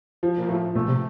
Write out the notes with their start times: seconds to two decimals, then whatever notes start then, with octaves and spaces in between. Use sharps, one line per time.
0.23 F3
0.38 A#2
0.48 A2 F3
0.75 A#2 A3
0.88 C3